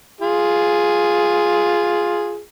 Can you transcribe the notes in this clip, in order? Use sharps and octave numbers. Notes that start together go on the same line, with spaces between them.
F4 G#4